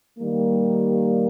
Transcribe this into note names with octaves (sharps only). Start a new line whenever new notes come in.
D#3 G3 A#3